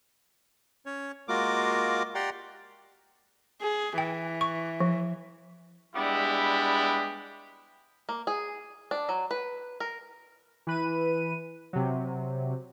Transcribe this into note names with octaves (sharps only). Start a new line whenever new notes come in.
C#4 C#5
G#3 A#3 F4 F#4 A#4 D6
G4 D5 F#5 G5 A#5 C6
G#4
E3 G5
C#6
F3
G3 G#3 B3 D4 E4 G4
A#3
G#4
D4
F#3
B4
A#4
E3 B4 D#7
C3 F#3